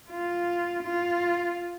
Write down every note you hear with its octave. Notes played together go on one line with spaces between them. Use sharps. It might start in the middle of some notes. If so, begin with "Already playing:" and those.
F4
F4